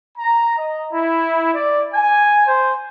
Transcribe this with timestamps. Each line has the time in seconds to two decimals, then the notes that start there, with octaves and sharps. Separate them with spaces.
0.18 A#5
0.58 D#5
0.93 E4
1.54 D5
1.94 G#5
2.47 C5